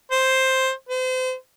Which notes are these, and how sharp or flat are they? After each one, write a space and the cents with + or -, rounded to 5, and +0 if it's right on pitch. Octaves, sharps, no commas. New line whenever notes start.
C5 +5
C5 -35